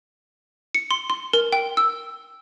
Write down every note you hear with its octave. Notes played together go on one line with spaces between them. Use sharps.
C#7
C6
C6
A#4
G5
E6